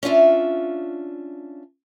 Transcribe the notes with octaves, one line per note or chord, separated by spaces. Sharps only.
C#4 D4 F4 E5